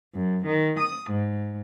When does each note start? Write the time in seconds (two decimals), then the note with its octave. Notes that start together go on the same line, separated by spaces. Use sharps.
0.14 F#2
0.46 D#3
0.78 D#6
1.09 G#2